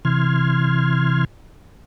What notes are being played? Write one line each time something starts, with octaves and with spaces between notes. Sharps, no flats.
C3 E3 C6 F6 G#6